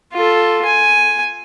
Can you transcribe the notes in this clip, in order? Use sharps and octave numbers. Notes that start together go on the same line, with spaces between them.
F4 A4
G#5